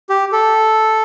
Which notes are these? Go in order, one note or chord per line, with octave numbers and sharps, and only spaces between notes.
G4
A4